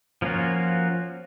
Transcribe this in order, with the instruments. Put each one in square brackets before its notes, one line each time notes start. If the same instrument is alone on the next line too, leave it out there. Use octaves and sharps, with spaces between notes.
[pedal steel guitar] F3 A#3 C#4 F4 F#4